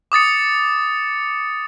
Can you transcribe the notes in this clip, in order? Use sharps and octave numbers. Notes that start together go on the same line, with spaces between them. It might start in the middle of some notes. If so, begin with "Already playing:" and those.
D6 D#6 A6 C#7